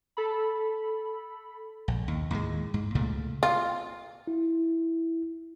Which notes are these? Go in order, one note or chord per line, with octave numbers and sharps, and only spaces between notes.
A4 B5
A#1
D#2
D#2 A2 G#3
G#2
C#2 A#2 C#3 A3
F4
E4